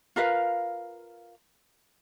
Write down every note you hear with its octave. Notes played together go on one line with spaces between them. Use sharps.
F4 A#4 B4 F5